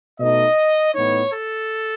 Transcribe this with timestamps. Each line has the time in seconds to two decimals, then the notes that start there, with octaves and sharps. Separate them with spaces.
0.19 B2 A3 D#4 D#5
0.94 A2 E3 B3 D#4 C#5
1.32 A4